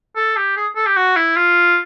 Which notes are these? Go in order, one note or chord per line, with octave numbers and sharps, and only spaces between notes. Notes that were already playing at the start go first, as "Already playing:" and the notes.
A4
G4
G#4
A4
G4
F#4
E4
F4